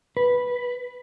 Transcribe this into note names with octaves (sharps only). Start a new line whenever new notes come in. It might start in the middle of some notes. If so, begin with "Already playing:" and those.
B4